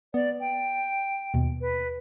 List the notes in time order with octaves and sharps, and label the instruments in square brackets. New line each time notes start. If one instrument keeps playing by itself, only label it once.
[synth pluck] B3 [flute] D5
[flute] G5
[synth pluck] D#2 B2
[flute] B4